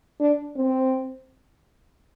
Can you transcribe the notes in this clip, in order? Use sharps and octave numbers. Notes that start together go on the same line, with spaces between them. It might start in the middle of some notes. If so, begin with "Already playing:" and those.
D4
C4